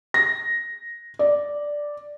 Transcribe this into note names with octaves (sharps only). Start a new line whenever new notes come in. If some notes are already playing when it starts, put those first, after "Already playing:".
A#6
D5